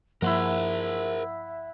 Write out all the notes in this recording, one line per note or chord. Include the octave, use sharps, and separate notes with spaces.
G2 F3 A#3 E4 A#4 C5 E5 F#5